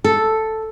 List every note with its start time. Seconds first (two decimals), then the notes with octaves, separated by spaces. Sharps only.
0.04 A4